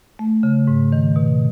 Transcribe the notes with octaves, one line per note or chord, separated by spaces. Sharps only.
A3
C#3
G#2
D#3
B2